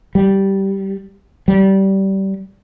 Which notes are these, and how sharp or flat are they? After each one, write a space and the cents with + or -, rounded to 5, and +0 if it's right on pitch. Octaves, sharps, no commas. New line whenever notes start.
G3 -10
G3 -20